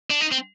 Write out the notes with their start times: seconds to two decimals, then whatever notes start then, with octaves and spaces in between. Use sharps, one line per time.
0.10 D4
0.21 D#4
0.32 C4